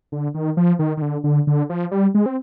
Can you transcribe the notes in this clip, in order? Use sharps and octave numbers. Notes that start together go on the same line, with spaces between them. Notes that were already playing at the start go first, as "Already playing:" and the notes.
D3
D#3
F3
D#3
D#3
D3
D3
D3
F3
G3
G#3
C4